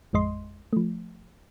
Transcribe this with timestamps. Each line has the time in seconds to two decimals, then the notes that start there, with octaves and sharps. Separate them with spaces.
0.13 A1 F2 G#3 D#5 C6
0.73 F3 A3